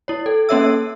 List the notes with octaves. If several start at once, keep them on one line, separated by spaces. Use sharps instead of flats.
E4 C#5
A4
A#3 C#4 A4 C#5 E5 E6